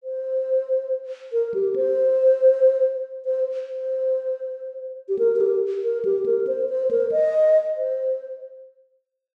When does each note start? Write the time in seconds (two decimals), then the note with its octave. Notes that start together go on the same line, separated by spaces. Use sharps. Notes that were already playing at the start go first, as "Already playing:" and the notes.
0.04 C5
1.33 A#4
1.54 G4
1.76 C5
3.25 C5
3.69 C5
5.09 G4
5.19 A#4
5.36 A#4
5.41 G4
5.84 A#4
6.05 G4
6.26 A#4
6.47 C5
6.69 C5
6.91 A#4
7.12 D#5
7.77 C5